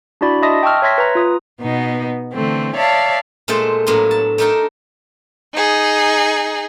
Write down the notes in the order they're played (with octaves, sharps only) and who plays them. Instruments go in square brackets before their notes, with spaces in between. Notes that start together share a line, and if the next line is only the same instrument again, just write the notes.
[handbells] D4 E4 F#4 D5 B5
D#5 E5 A5 C6 D#6 A#6
G5 A5 C#6 E6 F6
C#5 E5 C6 G#6 A#6 B6
B4 A#5
F4 D#6
[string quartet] B2 B3 D#4
D3 E3 A3 C4
C#5 D5 E5 F5 A5
[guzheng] A#2 G#3 A3 G4 C5 A5
A2 F#3 A#3 B3 D4 C6
A5
A3 D4 D#4 A#4 G5 A5
[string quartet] D#4 G#4